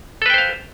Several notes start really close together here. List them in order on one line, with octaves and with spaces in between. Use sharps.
A4 B4 G5 C5 F5